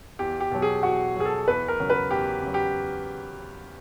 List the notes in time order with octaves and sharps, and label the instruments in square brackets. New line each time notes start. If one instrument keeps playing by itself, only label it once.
[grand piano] E2 G4
G4
B2 F#3
G#4
E2 F#4
B2 F#3 G#4
A4
E2 B4
A#4
C#3 F#3
B4
E2 G4
C#3 F#3
G4